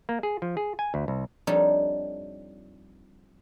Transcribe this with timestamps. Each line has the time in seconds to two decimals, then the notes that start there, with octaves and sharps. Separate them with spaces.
0.09 A#3
0.23 G#4
0.42 F3
0.57 G#4
0.79 G#5
0.94 D2
1.08 C2
1.47 F2 G3 D4 D#4 C#5 A5